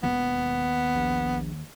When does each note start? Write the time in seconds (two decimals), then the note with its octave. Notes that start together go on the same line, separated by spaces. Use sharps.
0.03 E1 D#2 B3
0.95 A#1